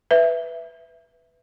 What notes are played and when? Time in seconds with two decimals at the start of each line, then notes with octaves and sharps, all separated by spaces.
0.11 B4 E5